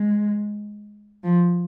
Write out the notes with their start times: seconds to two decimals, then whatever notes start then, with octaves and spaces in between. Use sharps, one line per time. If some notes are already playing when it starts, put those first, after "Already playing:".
Already playing: G#3
1.24 F3